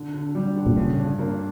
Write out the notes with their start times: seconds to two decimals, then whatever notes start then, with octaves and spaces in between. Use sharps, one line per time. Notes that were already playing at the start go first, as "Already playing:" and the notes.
Already playing: D3
0.14 D3
0.35 G3
0.56 D3
0.66 A#2
0.77 G2 C#3
0.98 G2
1.19 A#3